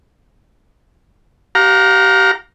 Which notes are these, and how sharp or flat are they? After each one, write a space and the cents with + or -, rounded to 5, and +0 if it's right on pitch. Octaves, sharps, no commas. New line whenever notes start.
G4 -30 F5 +25 A#5 +0